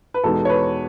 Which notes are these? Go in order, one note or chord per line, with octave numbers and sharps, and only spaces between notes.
B4
E2 B2 G#3 B3 D#4 A4
C#5
B4